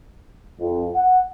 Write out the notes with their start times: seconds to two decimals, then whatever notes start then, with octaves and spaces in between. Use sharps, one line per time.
0.60 F2
0.94 F#5